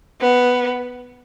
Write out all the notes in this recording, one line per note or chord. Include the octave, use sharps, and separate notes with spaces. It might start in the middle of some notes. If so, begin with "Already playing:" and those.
B3